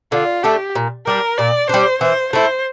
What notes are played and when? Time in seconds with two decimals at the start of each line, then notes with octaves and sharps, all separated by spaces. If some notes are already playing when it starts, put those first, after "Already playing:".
0.12 D3 F4
0.43 A3 D4 G4 A4
0.75 A#2
1.06 G3 D4 A#4
1.38 A#2 D5
1.69 G3 D4 C5
2.01 E3 C5
2.33 A3 E4 C5